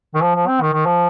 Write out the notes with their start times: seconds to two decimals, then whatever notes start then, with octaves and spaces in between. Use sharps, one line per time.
0.15 D#3
0.23 F3
0.35 F3
0.47 C4
0.61 D#3
0.73 D#3
0.86 F3